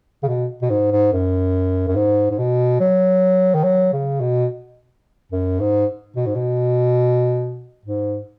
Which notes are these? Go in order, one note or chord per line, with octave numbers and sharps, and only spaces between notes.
C#3
B2
B2
G#2
G#2
F#2
F#2
G#2
G#2
B2
F#3
D#3
F#3
C#3
B2
F#2
G#2
B2
G#2
B2
G#2